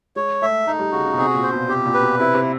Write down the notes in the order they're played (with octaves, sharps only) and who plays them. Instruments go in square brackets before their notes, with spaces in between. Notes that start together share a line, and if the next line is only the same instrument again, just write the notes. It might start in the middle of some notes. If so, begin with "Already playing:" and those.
[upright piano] G#3 [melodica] C#5
[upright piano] A3 [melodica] E5
[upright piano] A3 [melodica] D#4
[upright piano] G3
[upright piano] C#3 [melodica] F#4
[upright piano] C#3
B2
[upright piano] C3 [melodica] G#4
[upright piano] A#2
[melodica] C5
[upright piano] B2
[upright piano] C3 [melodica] G4
[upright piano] A#2
[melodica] B4
[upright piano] B2
[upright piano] C3 [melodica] E4
[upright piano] C3